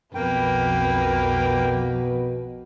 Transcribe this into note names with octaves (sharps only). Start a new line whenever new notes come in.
B1 F2 B2 A#3 B4 G5